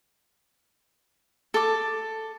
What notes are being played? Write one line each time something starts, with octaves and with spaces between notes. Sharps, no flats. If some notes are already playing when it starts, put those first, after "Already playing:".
A4 D6